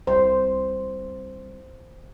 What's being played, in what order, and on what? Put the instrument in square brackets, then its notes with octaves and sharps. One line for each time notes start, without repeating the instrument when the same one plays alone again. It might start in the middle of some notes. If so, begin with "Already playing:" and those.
[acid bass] C2 [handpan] C5